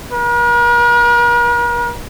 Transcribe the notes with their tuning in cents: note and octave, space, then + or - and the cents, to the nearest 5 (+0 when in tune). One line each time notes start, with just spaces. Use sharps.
A#4 +45